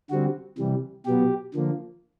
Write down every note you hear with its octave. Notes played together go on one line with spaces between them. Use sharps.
D3 G3 C4 F#4
C3 E3 G3
B2 F#3 B3 G4
D3 F3 A#3